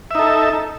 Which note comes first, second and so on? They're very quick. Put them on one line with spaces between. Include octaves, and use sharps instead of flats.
E5 D#4 A4